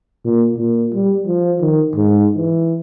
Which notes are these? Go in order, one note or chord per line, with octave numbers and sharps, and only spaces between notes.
A#2
A#2
G3
F3
D#3
G#2
E3